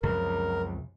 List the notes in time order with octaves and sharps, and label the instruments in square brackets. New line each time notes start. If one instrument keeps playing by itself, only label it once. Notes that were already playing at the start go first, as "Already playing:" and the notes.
[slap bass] C#2 [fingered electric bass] F#2 C3 F3 [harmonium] A#4